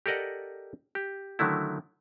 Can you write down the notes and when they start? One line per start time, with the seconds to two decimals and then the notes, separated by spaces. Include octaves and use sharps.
0.06 G4 A4 A#4 D5 D#5 F#5
0.95 G4
1.39 D3 D#3 F#3 A3 E4